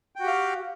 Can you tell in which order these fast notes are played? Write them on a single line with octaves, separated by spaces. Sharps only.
G5 F#4 G4 F5